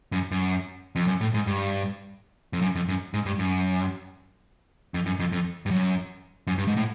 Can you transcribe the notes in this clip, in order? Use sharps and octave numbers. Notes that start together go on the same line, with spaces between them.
F#2
F#2
F2
F#2
A2
G#2
G2
F2
F#2
F2
F#2
G#2
G2
F#2
F2
F#2
F2
F2
G2
F#2
F#2
G2
G#2
A2